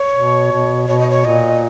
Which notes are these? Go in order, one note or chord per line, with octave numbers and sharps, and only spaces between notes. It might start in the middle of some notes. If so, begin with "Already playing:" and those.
Already playing: C#5
B2
B2
B2 C#5
D#5
C#5
A#2 D#5